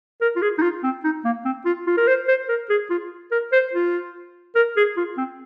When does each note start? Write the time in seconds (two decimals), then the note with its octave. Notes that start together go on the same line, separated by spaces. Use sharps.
0.21 A#4
0.36 F4
0.42 G#4
0.58 D#4
0.62 F4
0.84 C4
1.04 D#4
1.25 A#3
1.45 C4
1.65 F4
1.87 F4
1.97 A#4
2.07 C5
2.28 C5
2.49 A#4
2.70 G#4
2.90 F4
3.31 A#4
3.52 C5
3.73 F4
4.55 A#4
4.77 G#4
4.97 F4
5.17 C4